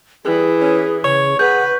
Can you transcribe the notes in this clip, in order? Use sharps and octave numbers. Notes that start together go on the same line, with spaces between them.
E3 G3 G#4
C#4
C#3 C#5 C#6
G#4 B4 F#5 G6